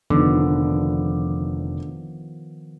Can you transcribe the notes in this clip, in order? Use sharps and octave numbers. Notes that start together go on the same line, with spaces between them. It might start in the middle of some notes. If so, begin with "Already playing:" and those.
F1 D3 D#3 F3 B3 D#4 D6